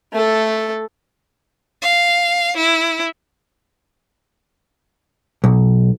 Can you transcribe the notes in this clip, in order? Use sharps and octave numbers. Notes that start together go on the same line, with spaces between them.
A3 A4
F5
E4
B1